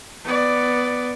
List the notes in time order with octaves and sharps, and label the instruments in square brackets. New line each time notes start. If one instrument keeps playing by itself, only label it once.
[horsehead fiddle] B3 D5